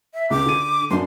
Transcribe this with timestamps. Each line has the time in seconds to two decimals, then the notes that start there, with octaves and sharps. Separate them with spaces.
0.14 E5
0.30 C#2 D6
0.46 D3 D#7
0.91 F#2 D4 C6